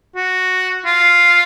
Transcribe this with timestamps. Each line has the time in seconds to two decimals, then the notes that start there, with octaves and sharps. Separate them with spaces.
0.16 F#4
0.85 F4